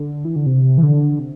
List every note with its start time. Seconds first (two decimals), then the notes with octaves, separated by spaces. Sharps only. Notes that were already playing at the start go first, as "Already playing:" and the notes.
Already playing: D3
0.25 E3
0.36 D3
0.46 C3
0.78 E3
0.83 D3
1.19 C3